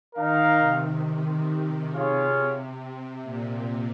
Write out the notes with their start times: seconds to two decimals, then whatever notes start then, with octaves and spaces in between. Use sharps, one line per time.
0.15 D#3 D#4 A#4 F5
0.59 C3
1.91 F4 G#4 C#5 F5
2.79 C3
3.23 A#2